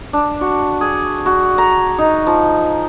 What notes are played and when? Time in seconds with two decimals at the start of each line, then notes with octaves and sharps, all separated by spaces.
0.13 D4
0.41 F#4
0.81 G#4
1.26 F#4
1.58 A#5
1.98 D#4
2.27 F3